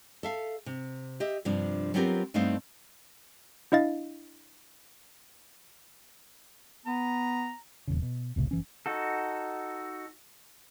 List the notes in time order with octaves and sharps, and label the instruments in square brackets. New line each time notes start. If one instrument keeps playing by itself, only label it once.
[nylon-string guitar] A4 E5 F5
C3
G4 D#5 E5
G2 C3 F3 D4
F#3 B3 C4 F4 G4 A#4
G2 A3 B3 C4 D#4 F5
[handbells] D4 E4 D#5 F5 A6
[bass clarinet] B3 [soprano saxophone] A#5
[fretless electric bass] D#1 E2 C#3
B2
E1 C2 A2 C#3
F#1 E3 C#4
[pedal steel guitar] D#4 F#4 A4